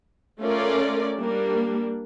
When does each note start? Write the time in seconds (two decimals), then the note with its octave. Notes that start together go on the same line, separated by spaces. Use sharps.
0.40 A3 C#4 F4 A#4 D5
1.18 G3 A#3 D4